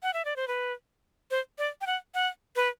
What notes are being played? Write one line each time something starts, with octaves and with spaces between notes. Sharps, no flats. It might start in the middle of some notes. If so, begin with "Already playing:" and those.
F#5
E5
D5
C5
B4
C5
D5
G5
F#5
F#5
B4